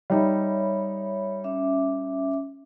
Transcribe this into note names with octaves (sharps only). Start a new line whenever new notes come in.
G3 D#4 C#5 E5 B5
C#4 E5 D6